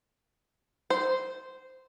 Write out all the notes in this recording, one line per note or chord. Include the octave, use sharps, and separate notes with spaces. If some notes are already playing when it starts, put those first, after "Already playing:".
C5